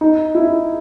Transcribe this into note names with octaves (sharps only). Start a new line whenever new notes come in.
D#4
E4